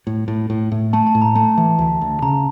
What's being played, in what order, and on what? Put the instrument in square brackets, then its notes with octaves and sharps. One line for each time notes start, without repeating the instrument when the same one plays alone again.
[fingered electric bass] A2
A2
A2
A2
[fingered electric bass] A3 [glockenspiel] A5
[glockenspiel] A5
[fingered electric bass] A2
[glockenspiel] A#5
[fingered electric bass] A3 [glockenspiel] A5
[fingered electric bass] E3
D2
D2
[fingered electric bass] C#3 [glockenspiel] A#5